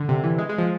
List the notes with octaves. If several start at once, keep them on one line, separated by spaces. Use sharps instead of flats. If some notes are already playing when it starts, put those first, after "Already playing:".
Already playing: D3
C3
E3
G#3
G#3
F3